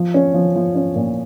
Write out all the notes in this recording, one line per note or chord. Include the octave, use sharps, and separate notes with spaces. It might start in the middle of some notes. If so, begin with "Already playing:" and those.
Already playing: F3
C#4
F3
F3
C#4
A#2